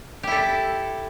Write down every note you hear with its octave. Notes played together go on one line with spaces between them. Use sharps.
E4 G4 A4